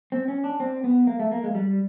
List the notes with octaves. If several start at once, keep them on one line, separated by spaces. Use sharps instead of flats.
C4
C#4
D4
C4
B3
A#3
A3
A#3
G#3
G3